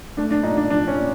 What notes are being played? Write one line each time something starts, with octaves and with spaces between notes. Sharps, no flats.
A3 D4
D4
A#2 D#4
D4
F3 D4
C#4
A#2